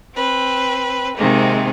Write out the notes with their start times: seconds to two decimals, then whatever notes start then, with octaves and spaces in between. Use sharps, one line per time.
0.14 C4 B4
1.17 C3 D#3 G#3 A#3 C4